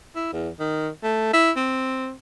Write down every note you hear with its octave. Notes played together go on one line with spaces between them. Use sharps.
E4
E2
D#3
A3
E4
C4